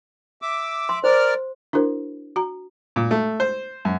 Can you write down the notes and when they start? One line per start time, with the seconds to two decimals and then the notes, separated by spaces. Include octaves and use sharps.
0.42 E5 D6
0.89 C6
1.04 A#4 C5 D5 F6
1.73 D4 E4 F#4 A#4 C5
2.36 F#4 A#5
2.96 A#2
3.11 A3
3.40 C5
3.85 F#2